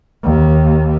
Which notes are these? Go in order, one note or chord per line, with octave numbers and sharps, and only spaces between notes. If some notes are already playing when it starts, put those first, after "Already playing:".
D#2